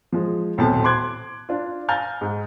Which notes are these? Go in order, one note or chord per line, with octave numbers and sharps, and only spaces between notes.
F3 G#3
D#1 B1 A2 C4 A5
C6 D6 F#6 G#6
D4 F4
F5 G#5 A#5 F6 G6 A6
G#2